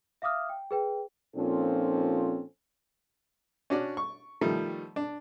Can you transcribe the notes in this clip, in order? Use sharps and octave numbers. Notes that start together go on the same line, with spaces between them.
E5 F5 D6 D#6 F6
G5
G#4 B4 G5
A#2 F3 C4 C#4 D#4 A4
C#4 D4 F#4 D5
C#6
D#3 F3 G3 A3
D4